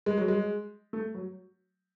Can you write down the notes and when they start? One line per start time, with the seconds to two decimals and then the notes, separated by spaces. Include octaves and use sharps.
0.06 G#3
0.18 F#3
0.28 G#3
0.93 A3
1.14 F#3